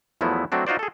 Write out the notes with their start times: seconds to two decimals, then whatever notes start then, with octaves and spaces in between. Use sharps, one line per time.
0.21 E2 F3 F#3 A3 B3 E4
0.52 F#3 A3 C4 D4 F#4
0.67 D#4 F4 F#4 C5 D5
0.79 G#4 A4